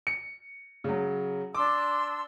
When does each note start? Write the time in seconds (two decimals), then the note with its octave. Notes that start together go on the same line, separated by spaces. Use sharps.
0.07 C#7
0.84 C#3 F#3
1.55 D4 C6 D6 E6